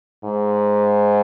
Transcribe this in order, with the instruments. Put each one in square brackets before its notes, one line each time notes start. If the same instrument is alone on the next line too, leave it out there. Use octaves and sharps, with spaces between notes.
[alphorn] G#2